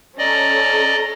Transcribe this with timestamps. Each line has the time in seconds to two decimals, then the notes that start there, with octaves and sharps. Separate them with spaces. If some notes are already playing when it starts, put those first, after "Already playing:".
0.18 C#4 A4 D5 D#5 A#5